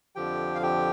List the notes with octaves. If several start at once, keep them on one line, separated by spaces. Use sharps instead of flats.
F2 D3 F3 G4 G5
F5
G4 G5